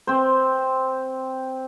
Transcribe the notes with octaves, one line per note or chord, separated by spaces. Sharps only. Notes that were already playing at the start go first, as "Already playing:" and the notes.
C4 C5